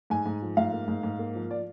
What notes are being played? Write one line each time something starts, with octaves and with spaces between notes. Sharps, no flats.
G#2 G#5
G#2
F3
G#2 F5
A#3
G#2
G#2
A#3
F3
D5